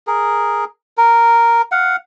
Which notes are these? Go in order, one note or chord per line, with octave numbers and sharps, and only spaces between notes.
G#4 A#4
A#4
F5 F#5